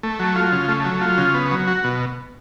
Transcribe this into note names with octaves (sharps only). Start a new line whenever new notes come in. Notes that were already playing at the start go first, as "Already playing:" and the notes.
A3
F#3
F4
C#3
A3
F#3
F4
C#3
B3
F#3
F#4
B2